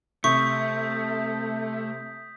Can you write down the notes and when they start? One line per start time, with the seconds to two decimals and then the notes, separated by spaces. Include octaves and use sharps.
0.24 C3 A3 C#6 D#6 G6 B6